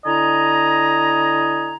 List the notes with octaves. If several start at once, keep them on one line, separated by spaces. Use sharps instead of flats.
D3 E4 D#5 G#5 A#5